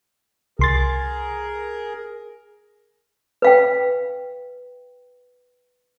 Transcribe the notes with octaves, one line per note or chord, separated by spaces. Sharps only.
C2 G#4 A#4 C6 A6
B4 F5 G5